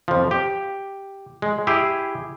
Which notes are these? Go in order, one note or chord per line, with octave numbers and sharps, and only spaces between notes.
F2 F3
G4
G#3
E4 G4 G#4